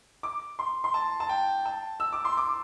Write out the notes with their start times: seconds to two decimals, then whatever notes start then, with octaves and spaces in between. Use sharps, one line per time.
0.23 D6
0.59 C6
0.84 C6
0.94 A5
1.20 A5
1.29 G5
1.65 A5
2.00 E6
2.13 D6
2.25 C6
2.37 D6